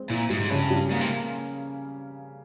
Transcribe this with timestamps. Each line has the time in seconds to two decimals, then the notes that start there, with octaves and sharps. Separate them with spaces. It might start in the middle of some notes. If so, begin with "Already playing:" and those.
Already playing: G#3 C4
0.10 A#2 E4
0.30 G#2 G3
0.41 G#2
0.50 G2 C#3
0.71 G3
0.91 G#2 A#3
1.01 C3